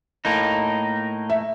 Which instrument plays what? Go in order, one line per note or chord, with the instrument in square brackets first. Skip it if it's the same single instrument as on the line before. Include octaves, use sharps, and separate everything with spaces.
[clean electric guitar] A2 A#3 D#4
[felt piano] E5